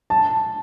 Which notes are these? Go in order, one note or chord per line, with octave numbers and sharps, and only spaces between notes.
A5